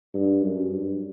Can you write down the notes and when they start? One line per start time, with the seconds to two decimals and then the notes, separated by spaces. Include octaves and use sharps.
0.14 G2
0.42 F#2
0.70 G2